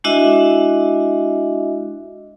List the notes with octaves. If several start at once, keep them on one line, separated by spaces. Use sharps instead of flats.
G#3 D4 E4 F#4 D#5 E5